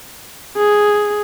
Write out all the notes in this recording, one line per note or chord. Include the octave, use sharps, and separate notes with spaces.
G#4